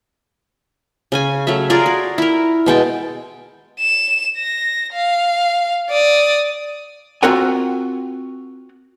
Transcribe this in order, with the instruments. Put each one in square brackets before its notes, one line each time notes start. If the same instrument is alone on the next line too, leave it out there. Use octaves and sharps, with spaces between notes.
[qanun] C#3 C#4 G#5
F#3 A3 C#4 E5
F4 G#4 A#4 D5
F#4
E4 A#4
B2 G#3 G5 A5
[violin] E7
A#6
F5
D5 D#6
[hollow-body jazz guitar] C4 F4 F#4 A#4 F#5 G#5